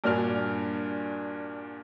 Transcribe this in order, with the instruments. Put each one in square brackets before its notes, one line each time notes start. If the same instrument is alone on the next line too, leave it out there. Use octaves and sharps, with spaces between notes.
[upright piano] G2 A#2 D4 F#4 G#5 F6